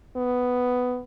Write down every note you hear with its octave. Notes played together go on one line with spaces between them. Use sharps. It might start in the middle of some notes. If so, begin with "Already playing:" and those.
B3